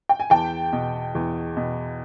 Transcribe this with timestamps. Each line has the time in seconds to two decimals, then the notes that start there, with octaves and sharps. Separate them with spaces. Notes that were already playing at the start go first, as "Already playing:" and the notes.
0.09 G5
0.20 G#5
0.30 E2 G5 A5
0.73 B2
1.15 E2
1.57 B2